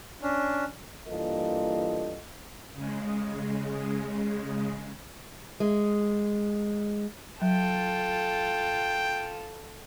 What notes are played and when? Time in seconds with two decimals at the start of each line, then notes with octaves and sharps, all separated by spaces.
0.22 C#4 D4
1.08 G2 E3 A#3 F4 A4 D#5
2.74 C#3 G#3
5.60 G#3
7.42 F#3 F4 A4 G5